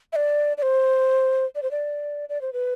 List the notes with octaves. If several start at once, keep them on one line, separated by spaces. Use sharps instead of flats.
E5
D5
D5
C5
D5
C5
D5
D5
C5
B4